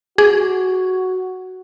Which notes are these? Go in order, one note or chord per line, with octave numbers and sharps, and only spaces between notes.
F#4 G#4 D6